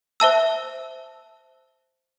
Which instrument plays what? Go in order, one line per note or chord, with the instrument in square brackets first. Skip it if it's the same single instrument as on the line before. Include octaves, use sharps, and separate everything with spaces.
[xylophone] C5 E5 A5 E6